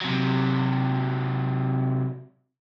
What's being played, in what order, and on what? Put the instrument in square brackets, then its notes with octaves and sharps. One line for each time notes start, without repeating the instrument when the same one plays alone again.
[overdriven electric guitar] C3 F#3